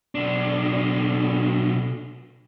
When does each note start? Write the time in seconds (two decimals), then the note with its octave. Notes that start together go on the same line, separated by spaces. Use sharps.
0.15 B1 D4